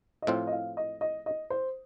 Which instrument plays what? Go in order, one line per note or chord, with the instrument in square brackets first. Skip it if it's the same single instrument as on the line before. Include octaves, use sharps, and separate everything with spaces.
[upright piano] D#5
[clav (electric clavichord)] A2 F3 C4 F4 [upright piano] F5
[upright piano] D#5
F5
D#5
D#5
D#5
C5